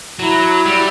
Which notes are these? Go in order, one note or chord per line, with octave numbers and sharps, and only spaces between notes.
F#3 E4
G3